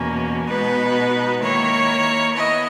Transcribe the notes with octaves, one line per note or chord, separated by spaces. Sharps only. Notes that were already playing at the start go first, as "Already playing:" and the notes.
Already playing: E2 B2 A#3 C#4
B2 G#3 B3 D#4 B4
D#3 A#3 E4 C#5
B3 E4 D#5